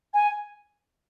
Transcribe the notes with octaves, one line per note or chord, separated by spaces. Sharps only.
G#5